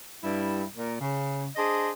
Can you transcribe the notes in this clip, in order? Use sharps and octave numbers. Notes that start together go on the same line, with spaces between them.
G2 G3 E4
A#2 A#4
C#3
D4 G#4 C5 D#5